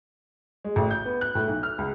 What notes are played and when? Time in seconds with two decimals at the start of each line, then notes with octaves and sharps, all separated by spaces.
0.64 G#3
0.76 A1
0.91 G6
1.05 B3
1.21 F#6
1.35 A2
1.47 B1
1.63 F6
1.78 C#2